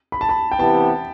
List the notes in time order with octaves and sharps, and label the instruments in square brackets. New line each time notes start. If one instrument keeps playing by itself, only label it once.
[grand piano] B5
A5
B5
G5
[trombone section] C3 E3 B3 E4 G4 [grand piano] A5